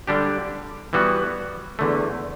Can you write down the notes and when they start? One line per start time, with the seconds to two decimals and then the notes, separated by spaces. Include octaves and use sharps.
0.07 D3 G3 D4 G4
0.93 E3 G3 B3 F#4
1.79 E2 D3 A3